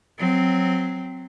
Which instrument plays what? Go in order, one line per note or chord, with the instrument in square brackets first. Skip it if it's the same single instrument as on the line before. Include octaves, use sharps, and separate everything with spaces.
[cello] F#3 C4